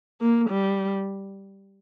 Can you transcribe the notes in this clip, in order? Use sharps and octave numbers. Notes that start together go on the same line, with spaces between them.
A#3
G3